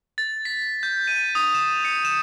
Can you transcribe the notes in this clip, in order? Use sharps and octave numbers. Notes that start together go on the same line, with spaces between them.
A6
B6
G6
D#7
D#6
E7
C#7
E7